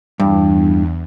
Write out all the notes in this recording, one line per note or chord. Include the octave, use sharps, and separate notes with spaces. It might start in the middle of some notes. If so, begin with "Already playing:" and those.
E2 G2